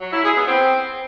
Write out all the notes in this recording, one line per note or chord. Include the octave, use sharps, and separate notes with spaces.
F#3
E4
G#4
B3
C4